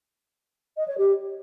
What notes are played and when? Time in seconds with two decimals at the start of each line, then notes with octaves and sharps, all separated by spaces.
0.77 D#5
0.87 C#5
0.97 G4